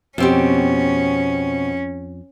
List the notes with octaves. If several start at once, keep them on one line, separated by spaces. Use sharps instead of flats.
F2 B2 C4 C#4 G4